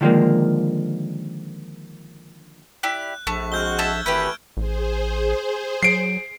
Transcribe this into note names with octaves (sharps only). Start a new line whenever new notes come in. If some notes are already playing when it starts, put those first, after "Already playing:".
D3 D#3 F3 G#3 A#3
E4 G4 D5 F#6
A#1 A3 C#6
G#3 C4 F#4 F6 G6 G7
A4 E5 A5 E6 G#6
G#1 E3 A3 G4 B4 B5 G6 D7
A1 G#4 C5
F#3 C7 D7